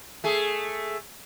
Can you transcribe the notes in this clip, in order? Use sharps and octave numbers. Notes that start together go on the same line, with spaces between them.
A3 G#4